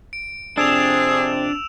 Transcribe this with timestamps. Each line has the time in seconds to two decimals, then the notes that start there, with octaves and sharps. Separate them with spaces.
0.13 D7
0.58 F2 C3 C4 D4 G#4 E6 E7 F7